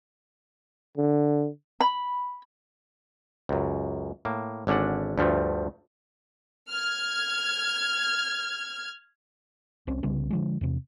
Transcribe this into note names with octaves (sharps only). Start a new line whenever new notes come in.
D3
B5
C#2 F#2
A2 A#3
G#1 D3 C#4 D4 F#5
D2 G2 F3 A3
F6 G#6
C2 C4 C#4
C2 C#3 G3 B3
D3 F3 G#3
E2 C3